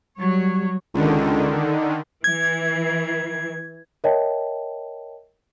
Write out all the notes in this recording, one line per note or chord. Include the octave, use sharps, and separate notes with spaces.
F#3 G3 C#5
C#2 D3 D#3
E3 G#6
A#4 C#5 D#5 E5 G5 A5